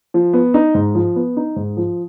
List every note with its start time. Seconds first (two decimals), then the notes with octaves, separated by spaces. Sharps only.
0.14 F3
0.33 B3
0.54 D#4
0.74 G#2
0.95 F3
1.16 B3
1.37 D#4
1.56 G#2
1.77 F3